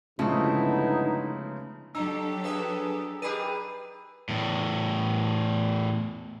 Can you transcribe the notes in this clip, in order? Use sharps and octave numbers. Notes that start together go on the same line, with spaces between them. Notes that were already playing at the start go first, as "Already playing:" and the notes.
G1 C#3 F3 G#3 A3 B3 D#4 E4
F#3 D4 G4 A4 A#5 E6
D4 G#4 B4 E5
D#4 G4 G#4 A#4 B4 D5 B5 D#7
E2 A2